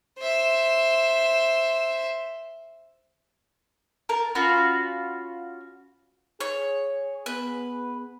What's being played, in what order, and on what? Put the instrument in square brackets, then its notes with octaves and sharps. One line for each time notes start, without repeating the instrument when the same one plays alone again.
[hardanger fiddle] C5 E5
[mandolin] A#4 A5
C#4 F4 F#4 B5
[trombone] G#4 [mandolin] C#5
[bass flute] B3 [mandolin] B4